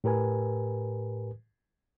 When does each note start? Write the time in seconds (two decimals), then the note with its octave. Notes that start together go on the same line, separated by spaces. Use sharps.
0.04 A2 G4 A#4 B4 G#5